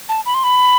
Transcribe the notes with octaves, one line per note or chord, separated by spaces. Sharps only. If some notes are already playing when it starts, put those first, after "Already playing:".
A5
B5
C6
B5